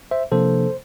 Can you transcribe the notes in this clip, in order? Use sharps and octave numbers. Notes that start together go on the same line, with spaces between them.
C5 E5
C3 F3 A#3 D4 A4 C5